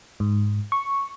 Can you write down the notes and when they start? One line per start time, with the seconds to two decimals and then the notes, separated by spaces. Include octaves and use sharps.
0.20 G#2
0.72 C#6